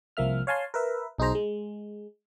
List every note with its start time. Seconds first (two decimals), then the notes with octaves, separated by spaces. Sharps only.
0.17 C2 F3 A#3 E5 F6
0.47 C#5 F5 G#5 A5 C6
0.74 A#4 B4 E5
1.18 B1 D#4 G#4 C5 A#5
1.35 G#3